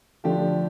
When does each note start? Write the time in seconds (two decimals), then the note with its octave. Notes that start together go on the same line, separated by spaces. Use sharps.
0.24 D3 F3 A3 D4 G4